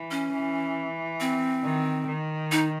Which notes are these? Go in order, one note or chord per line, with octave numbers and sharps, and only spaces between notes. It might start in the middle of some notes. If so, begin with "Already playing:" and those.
Already playing: E3
C#4
E3
C4
D#3
D#3
D#4